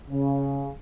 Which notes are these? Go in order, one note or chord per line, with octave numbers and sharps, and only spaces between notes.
C#3